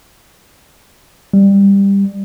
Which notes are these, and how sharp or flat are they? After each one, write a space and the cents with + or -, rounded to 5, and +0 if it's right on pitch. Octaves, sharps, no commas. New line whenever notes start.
G3 +15